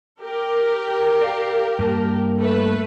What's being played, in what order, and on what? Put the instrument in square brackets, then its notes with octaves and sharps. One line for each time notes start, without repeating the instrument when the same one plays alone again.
[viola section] G4 A#4
[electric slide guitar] D5 F5
G2 A#3 A5
[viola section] A3 B4